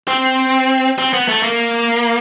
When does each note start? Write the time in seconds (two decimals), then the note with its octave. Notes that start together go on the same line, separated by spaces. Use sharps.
0.08 C4
0.99 C4
1.13 B3
1.28 A3
1.43 A#3